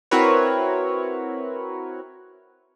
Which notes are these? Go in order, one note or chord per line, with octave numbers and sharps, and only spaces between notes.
C4 E4 F#4 A#4 B4 C#5